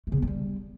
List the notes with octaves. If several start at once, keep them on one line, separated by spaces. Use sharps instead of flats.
A3
C#3
B3
F3
G3